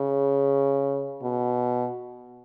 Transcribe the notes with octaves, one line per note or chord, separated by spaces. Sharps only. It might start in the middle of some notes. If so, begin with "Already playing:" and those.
Already playing: C#3
B2